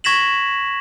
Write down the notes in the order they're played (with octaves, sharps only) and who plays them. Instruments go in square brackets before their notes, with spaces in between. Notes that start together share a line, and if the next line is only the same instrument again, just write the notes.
[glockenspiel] C#6 G#6 A#6 B6 E7 F#7